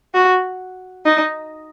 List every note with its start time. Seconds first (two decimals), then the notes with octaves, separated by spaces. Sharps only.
0.14 F#4
1.06 D#4